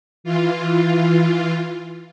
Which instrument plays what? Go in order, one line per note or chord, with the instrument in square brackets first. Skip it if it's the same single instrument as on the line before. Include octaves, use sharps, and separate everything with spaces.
[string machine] E3 F4